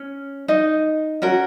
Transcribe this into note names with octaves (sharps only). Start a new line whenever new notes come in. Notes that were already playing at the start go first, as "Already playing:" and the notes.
Already playing: C#4
D#4 D#5
C#4 F#4 A#4